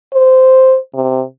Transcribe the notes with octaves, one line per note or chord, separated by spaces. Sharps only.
C5
C3